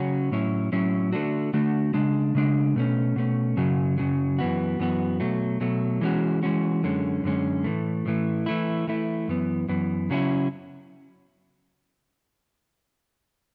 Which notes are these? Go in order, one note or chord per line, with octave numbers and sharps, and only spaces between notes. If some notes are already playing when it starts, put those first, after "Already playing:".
Already playing: C#3 F#3 C#4 F#4
A2 F#3 C#4 E4
A2 F#3 C#4 E4
D3 A3 D4 F#4
D3 A3 D4 F#4
C#3 G#3 D4
C#3 G#3 D4
B2 A3 C#4
B2 A3 C#4
F#2 C#3 F#3
F#2 C#3 F#3
F#2 E3 B3 F#4
F#2 E3 B3 F#4
B2 F#3 A3
B2 F#3 A3
E3 G#3 C#4 F#4
E3 G#3 C#4 F#4
F#2 D3 G#3 C#4
F#2 D3 G#3 C#4
A2 E3 A3
A2 E3 A3
E3 A3 E4
E3 A3 E4
F#2 E3 B3
F#2 E3 B3
C#3 F#3 C#4 E4